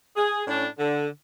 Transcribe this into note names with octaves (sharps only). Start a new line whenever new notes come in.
G#4
A2 C#4 D4
D3